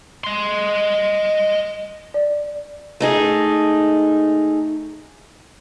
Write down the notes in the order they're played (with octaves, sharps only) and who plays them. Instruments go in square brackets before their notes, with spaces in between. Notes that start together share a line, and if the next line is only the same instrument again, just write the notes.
[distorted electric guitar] D#5 C6
[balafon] D5
[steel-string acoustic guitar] A3 D#4 G#4